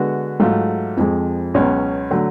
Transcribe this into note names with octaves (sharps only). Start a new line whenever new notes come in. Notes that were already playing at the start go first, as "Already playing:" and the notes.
Already playing: D3 G#3 B3 F#4
G#2 F#3 A3 F4
F2 F3 G#3
C#2 B2 F#3 C#4
D3 F#3 A3